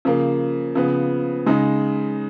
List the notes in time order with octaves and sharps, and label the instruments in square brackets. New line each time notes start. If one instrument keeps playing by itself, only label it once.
[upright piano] C#3 F3 A#3
C#3 F3 B3
C#3 G#3 D#4